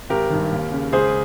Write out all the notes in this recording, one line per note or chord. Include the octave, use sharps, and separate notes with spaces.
G#1 G4 A#4
G2 D#3
D#2
C#3
C#2 G#4 C5